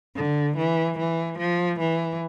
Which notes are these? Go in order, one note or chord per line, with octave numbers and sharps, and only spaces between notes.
D3
E3
E3
F3
E3